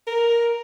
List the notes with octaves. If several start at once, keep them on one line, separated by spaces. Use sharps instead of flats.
A#4